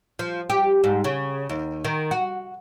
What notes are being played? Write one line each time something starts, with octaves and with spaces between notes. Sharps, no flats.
F3
G4
G#2
C#3
D#2
D#3
F#4